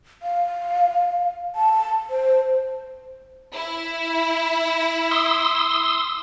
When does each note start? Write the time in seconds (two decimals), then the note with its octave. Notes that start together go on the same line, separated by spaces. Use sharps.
0.22 F5
1.55 A5
2.10 C5
3.53 E4
5.11 C6 D#6 E6